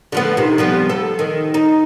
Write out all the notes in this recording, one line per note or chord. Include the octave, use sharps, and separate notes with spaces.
D3 F3 B3
C3 D#3
F3 G3 B3
A4
D#3
D#4